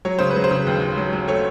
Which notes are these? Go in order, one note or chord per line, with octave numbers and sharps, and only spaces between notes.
F#3 C#5
C#3 C5
B4
F#3
C5
C#3
D#2
D#2
F#3
F#3
A3 C#5